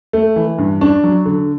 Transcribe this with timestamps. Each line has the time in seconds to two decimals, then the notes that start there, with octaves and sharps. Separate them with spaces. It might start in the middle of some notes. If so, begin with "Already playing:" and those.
0.13 A3
0.36 E3
0.58 G2
0.81 D4
1.04 F#3
1.26 D3